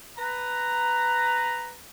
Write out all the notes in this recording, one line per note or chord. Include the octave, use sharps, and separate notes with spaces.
B4 A#5